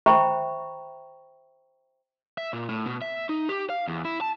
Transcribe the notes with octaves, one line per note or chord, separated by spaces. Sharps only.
C5 E5 G5 A#5 B5 C#6
E5
A#2
A2
B2
E5
D#4
G4
F5
E2
E4
A5